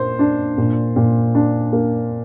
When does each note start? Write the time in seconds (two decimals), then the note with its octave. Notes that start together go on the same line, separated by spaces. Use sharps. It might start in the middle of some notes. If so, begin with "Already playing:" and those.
Already playing: A#2 A#3 C5
0.19 D4
0.58 A#2
0.96 A#2
1.35 D4
1.73 A#3